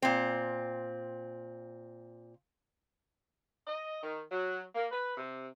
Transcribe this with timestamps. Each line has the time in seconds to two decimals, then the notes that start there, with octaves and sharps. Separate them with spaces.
0.02 A#2 C4
3.67 D#5
4.03 D#3
4.31 F#3
4.75 A#3
4.92 B4
5.17 C3